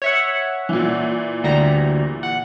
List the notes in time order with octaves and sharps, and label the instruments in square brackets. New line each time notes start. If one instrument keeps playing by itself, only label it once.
[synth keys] C#5 E5 F#5
[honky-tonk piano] A#2 E3
[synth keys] D2 G3 A#5
F#5